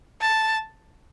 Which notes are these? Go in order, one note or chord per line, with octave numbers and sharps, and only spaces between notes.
A5